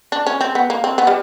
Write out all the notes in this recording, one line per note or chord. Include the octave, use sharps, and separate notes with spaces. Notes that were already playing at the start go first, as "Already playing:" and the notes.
D4
C#4
C4
B3
A#3
C4
B3
G3